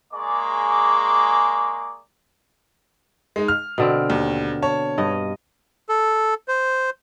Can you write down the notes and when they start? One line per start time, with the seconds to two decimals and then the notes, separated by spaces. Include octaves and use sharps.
0.14 G#3 A#3 G#4 D5 C#6 D6
3.36 G#3 D#4
3.48 F6
3.78 B2 D3 C4
4.10 D#2
4.62 C#5 A5
4.98 G2 D#5
5.89 A4
6.48 C5